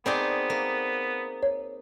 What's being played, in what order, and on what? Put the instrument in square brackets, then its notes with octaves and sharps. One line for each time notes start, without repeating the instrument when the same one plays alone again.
[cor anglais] B3 [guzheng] C4 D#4 G#4 [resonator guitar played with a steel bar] A#4 D5
[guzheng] A#3
[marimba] C#5